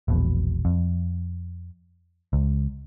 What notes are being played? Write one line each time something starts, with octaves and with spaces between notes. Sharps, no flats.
E1 A#1 B2
F2
C#2